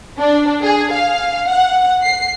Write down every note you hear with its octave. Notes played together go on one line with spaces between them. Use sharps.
D4
G#4
F5
F#5
C7